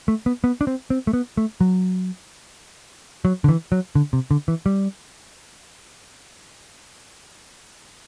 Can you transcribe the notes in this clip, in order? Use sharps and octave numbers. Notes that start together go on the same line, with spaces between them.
A3
B3
B3
D4
C4
C4
A3
B3
A3
F#3
F#3
D3
E3
F#3
D3
C3
D3
E3
G3